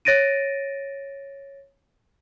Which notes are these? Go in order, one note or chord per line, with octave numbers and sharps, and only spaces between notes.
C#5 A6 A#6 D7 D#7